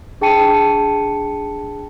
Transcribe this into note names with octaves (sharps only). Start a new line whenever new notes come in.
D4 G#4 G5 A5 C#7 D#7